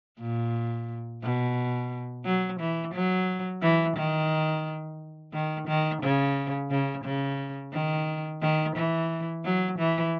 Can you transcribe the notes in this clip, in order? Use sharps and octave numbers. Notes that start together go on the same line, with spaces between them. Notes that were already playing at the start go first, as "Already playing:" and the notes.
A#2
B2
F#3
E3
F#3
E3
D#3
D#3
D#3
C#3
C#3
C#3
D#3
D#3
E3
F#3
E3